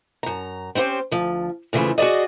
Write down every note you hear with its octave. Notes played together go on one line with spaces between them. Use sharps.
F#2 A#5
C4 C#4 E4 G4 C5
D2 F3
E2 C#3 E3 F3 A3
F#4 G#4 A4 D5 D#5